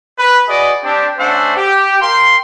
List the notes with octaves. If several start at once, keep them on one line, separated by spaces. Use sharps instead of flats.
B4
F#4 G#4 B4 D5 D#5
C4 D4 G4
A3 C#4 D4 C5 E5 F#5
G4
A#4 F5 G5 C6